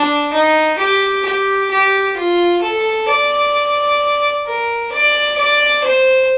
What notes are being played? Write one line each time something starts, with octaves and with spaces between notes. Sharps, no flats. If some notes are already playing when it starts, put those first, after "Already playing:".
Already playing: D4
D#4
G4
G4
G4
F4
A4
D5
A#4
D5
D5
C5